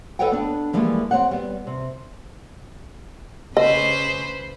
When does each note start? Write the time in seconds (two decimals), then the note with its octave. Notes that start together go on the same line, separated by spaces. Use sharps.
0.19 A4 B4 C#5 D#5 F#5 G5
0.32 B3 D4
0.73 E3 F3 G3 G#3 A#3
1.11 C4 C#5 F#5
1.31 G3 B3
1.67 C3
3.57 C#3 B4 C5 D#5